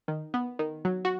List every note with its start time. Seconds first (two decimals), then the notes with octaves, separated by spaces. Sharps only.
0.08 D#3
0.34 B3
0.59 D#3
0.85 F#3
1.05 F#4